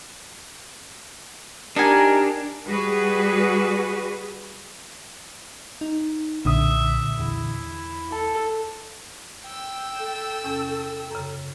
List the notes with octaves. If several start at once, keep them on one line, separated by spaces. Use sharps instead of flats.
D4 D#4 G4 A#4 G#5
G3 F#4 G#4 B4
D#4
B1 A#2 D3 E5 D#6
E2 E4
A4 A5
G5 E6
A4
E2 C3 C#4
F#2 C#3